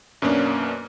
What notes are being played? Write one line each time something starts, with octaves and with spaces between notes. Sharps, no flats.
F#2 B2 A#3 C#4 D4